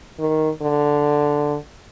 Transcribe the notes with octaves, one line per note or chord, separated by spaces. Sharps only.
D#3
D3